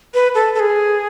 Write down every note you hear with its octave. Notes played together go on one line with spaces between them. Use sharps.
B4
A4
A4
G#4